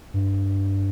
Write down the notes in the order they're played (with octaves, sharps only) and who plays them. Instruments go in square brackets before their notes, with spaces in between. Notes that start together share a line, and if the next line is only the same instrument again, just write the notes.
[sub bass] G2